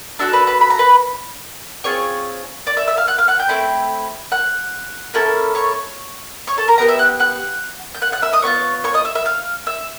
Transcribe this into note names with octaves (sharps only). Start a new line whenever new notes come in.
D4 F#4 A4 E5 E6
B4 B5
B4 B5
B5
A#5
B4 B5
C4 F4 G#4 C#5 C#6
D5 D6
E5 E6
E5 E6
F5 F6
F#5 F#6
F5 F6
F#5 F#6
G5 G6
A3 C4 E4
F#5 F#6
A#3 C#4 E4 A4
C#5 C#6
C#5 C#6
A4 A5
A#4 A#5
B3 D#4 G4 A#4 A#5
E5 E6
F#5 F#6
F#5 F#6
G6
F#5 F#6
F#5 F#6
E5 E6
D#5 D#6
B3 D4 F4 C#5 C#6
C#5 C#6
D#5 D#6
E5 E6
E5 E6
F5 F6
E5 E6